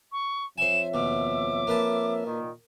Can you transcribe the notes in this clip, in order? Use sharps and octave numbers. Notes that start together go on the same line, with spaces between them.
C#6
F2 C5 C#5 E5 G#5 E7
D#2 B2 D6
A#3 B4 A5
A#2 D#3